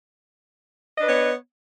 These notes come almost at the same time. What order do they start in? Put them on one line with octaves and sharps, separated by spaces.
D#5 D4 B4 B3 C#5